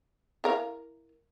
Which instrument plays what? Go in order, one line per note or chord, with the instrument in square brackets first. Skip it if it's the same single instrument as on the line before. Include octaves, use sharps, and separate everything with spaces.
[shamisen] E4 A#4 F5